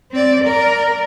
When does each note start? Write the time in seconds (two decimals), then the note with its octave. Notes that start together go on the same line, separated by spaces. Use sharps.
0.11 C4 D5
0.45 A#4 D5